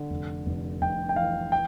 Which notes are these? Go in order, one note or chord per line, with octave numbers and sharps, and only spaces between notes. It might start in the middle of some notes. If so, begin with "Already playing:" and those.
Already playing: D3
F1
F1
F1 G5
G5
E3 F5
G5